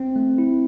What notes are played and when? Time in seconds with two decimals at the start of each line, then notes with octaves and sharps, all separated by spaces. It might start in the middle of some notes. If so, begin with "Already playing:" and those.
Already playing: C4
0.16 A3
0.38 E4